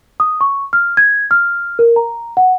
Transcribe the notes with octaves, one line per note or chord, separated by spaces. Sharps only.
D#6
C#6
F6
G#6
F6
A#4
A#5
F#5